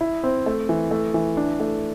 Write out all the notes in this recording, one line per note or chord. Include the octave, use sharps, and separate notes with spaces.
E4
C4
A3
E3
A3
E3
D4
A3